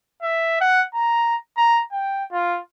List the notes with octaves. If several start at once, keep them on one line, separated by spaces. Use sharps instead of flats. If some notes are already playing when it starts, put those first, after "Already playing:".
E5
F#5
A#5
A#5
G5
F4